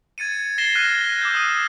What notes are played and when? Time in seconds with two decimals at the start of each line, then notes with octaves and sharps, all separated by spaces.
0.18 G#6 A6 C#7 D#7
0.58 A6 A#6 C7 E7 G7
0.75 F6 F#6 G#6 B6 D#7
1.21 D6 E6 G6
1.35 D#6 E6 D#7